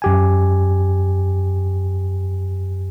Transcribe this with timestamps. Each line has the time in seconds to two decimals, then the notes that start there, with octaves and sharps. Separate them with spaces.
0.02 F#2 G4 G#5